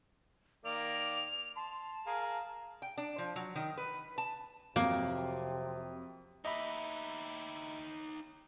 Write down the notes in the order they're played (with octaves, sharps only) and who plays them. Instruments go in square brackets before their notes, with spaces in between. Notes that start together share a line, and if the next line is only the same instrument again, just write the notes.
[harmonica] D#3 A#3 D5 [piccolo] F7
[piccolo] A5 [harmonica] C6
[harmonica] G#4 A#4 F5
[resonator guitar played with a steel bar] G5
D4
F3
F#3
D#3
B4
A5
[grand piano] F2 F#3 [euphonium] C3 [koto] A#3
[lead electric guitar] D#4 G4 [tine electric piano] D#5 E5 B5